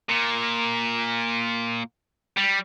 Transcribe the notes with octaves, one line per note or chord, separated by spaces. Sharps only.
A#2
G3